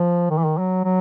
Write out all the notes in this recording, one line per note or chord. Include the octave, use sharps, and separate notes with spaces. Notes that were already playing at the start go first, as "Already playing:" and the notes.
Already playing: F3
D#3
E3
D#3
F#3
F#3